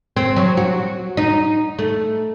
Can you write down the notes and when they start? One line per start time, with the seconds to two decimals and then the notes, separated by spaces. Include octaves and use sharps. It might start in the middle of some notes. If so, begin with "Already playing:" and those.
0.17 C4
0.36 F#3
0.57 F#4
1.17 D#4
1.79 A3